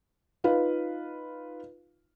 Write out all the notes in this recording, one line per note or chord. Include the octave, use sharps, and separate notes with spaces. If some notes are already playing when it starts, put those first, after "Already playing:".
D#4 F4 B4 F5